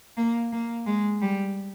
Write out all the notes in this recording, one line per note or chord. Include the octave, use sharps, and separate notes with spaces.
A#3
A#3
G#3
G3